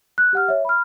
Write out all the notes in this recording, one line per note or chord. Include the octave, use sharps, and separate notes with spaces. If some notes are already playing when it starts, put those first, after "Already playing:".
F#6
G4 F#5 F6
C#5 E5
B5 F6